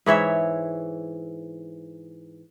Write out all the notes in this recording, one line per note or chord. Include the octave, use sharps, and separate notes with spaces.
G#2 E3 C#5 E5